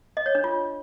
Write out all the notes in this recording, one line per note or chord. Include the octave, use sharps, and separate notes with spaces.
D#5
C#5
D4
F4